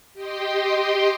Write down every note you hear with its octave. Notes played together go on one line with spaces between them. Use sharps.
G4 D#5 G5 C6